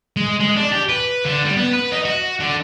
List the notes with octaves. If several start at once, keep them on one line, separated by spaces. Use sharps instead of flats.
G#3
G#3
D4
G4
B4
D3
G3
B3
B4
D#4
F#4
D3